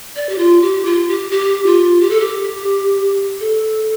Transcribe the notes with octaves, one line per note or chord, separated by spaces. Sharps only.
D5
G4
F4
G4
F4
G4
G4
F4
G4
A4
G4
A4